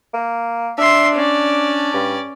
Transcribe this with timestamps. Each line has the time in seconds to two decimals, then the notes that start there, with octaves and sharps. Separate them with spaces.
0.13 A#3
0.78 D4 E5 C6
1.16 C#4 D5
1.94 G2